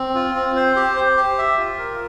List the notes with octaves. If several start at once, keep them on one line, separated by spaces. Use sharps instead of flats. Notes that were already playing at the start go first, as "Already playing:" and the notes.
Already playing: C4
F4
C4
C5
G4
C5
G4
E5
F4
A#4